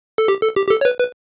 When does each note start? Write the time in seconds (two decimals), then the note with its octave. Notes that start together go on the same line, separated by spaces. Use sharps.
0.18 A4
0.28 G4
0.43 A4
0.56 G4
0.67 G4
0.70 A4
0.81 C#5
0.85 B4
0.99 B4